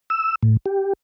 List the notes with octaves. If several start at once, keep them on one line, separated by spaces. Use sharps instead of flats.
E6
A2
G4